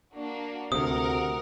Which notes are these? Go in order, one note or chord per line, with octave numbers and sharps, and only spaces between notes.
A#3 D4 F#4
D2 C3 A#4 F#5 D#6